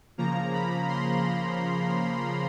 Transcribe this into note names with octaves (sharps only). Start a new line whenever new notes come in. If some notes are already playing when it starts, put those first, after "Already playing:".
C#3 F3 A#3 A#5
B5
C6